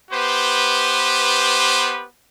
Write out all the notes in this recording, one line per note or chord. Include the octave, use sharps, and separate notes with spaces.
B3 G4 B4 C5